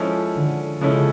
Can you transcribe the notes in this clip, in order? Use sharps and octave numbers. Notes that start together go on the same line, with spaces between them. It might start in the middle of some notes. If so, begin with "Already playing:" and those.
Already playing: F3 G#3 C#4 E4 A4
D3
C#3 F3 G#3 C#4 E4 A4